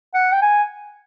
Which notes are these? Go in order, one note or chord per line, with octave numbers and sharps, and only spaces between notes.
F#5
G5
G#5